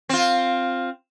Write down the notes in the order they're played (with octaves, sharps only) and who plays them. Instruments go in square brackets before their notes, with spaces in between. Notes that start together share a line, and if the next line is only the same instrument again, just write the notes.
[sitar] C4 F4